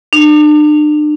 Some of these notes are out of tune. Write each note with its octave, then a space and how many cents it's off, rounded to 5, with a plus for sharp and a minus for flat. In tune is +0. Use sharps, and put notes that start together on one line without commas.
D4 +40